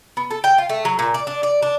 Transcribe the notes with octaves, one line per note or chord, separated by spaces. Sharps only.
B3
A4
G5
F4
A3
F#3
A#2
D5
D4
D5
D4